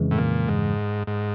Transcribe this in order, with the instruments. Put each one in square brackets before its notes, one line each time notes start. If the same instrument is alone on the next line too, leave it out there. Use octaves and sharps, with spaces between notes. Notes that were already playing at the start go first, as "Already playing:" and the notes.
Already playing: [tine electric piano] F2 C#3 E3 G#3
[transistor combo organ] A2
A#2
G#2
G#2